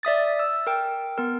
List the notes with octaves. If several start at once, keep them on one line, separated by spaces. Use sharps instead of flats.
D5 E5 D#6 A6
E6
A#4 G5
B3 A#4